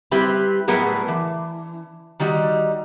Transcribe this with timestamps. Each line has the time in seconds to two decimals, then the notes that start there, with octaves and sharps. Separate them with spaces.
0.11 G3 C4 E4 G4 B4
0.68 A2 F#3 G3 B3 G#4 A#4
1.08 E3
2.20 D#3 G3 D#4 F#4